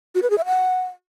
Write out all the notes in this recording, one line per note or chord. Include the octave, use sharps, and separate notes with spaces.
F#4
B4
G#4
E5
F#5